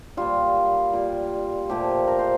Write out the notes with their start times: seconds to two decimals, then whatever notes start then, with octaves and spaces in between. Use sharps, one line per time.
0.17 A#2 G3 F4
0.93 A#2 G3
1.69 A#2 F3 A3 G4
2.07 A#4
2.19 C5